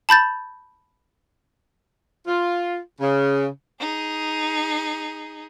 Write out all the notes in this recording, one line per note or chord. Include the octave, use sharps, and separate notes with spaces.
A5 B5 G6 A6
F4
C#3
D#4 G#4